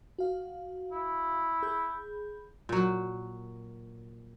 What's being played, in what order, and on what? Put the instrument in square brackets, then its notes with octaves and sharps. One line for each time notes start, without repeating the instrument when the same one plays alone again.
[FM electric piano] F#4 F5
[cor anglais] E4
[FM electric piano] G#4 B5 G6
[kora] A#2 F#3